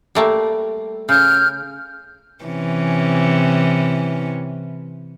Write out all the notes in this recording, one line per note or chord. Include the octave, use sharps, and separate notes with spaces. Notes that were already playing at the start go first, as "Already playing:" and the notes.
G3 A3 A#3
C#3 F6 G6
C3 E3 C#4